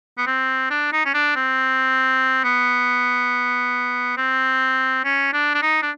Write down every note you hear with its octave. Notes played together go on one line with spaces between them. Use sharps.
B3
C4
D4
D#4
C#4
D4
C4
B3
C4
C#4
D4
D4
D#4
D4